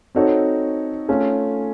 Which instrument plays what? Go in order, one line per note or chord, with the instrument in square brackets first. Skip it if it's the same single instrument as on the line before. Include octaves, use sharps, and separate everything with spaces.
[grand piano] C4 D#4 F#4 A4 C#5
A3 C#4 F4